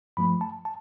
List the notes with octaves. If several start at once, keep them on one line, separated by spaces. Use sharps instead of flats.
G2 F3 A3 B5
A5
A5